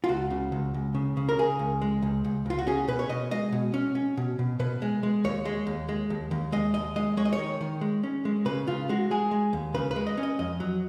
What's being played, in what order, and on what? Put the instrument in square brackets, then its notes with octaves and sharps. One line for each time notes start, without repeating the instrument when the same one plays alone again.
[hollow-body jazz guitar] F4
C#2 F#4
C#3
C#2
C#2
C#3
C#3
A#4
C#3 G#4
C#2
G#3
C#2
C#2
C#2 F4
F#4
C#4 G#4
B2 B4
C#5
B2 D#5
G#3 D#5
B2
C#4
C#4
B2
B2
B2 B4
G#3
G#3
D#2 C#5
G#3
D#2
G#3
D#2
D#2
G#3 D#5
D#2 D#5
G#3 D#5
G#3 C#5
D#5
C#5
D#3
D#3
G#3
C#4
G#3
C#3 B4
C#3 F4
G#3 F#4
G#3 G#4
G#3
D#2
C#3 B4
B4
G#3
D#5
C#4
D#5
F2 D#5
F#3